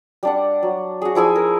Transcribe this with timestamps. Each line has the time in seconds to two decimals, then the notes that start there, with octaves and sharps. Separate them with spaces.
0.23 G3 D4 F#5
0.63 F#3
1.02 F#4 G#4
1.15 F3 E4 G#4 G#5
1.36 A#4